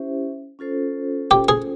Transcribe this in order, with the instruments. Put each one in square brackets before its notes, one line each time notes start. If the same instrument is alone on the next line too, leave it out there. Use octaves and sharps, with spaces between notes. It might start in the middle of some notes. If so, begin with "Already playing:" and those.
Already playing: [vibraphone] C#4 E4 G4 C5 E5
C#4 F4 A4 C5
[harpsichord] G4
G#4